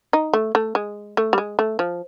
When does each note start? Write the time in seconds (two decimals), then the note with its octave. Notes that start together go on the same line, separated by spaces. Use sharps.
0.13 D#4
0.33 A3
0.55 A3
0.75 G#3
1.17 A3
1.33 G3
1.38 G#3
1.59 A3
1.79 F3